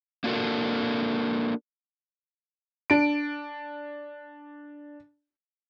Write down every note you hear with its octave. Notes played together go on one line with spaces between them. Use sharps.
A#3 D4 F#4 G4 A4 A#4
D4 D7